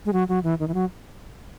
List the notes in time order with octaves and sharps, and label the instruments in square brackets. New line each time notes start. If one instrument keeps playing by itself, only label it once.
[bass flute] G#3
F#3
F#3
E3
D#3
E3
F#3